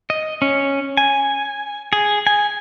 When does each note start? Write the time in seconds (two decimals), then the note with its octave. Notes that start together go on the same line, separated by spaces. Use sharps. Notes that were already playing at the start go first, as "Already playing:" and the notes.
0.10 D#5
0.42 C#4
0.97 G#5
1.93 G#4
2.27 G#5